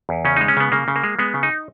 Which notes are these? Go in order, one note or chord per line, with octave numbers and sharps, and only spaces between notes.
E2
C#3 C#4
G#3 D#4
C#4
C#3 B3
C#3 A#3
C#3
A#3
G#3
G#3 B3
C#3
D#4